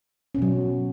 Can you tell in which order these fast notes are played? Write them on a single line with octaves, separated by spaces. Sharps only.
C#4 B2 F#3